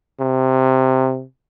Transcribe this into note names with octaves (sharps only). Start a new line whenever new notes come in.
C3